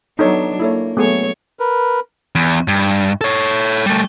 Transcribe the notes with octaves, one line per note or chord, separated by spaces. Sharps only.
F#3 B3 D4 D#4 A4 C#5
A#3 E4 A4 C#5
F#3 A3 B3 G#4 C#5
A#4 B4
E2
G2
A4 C#5
G3 A3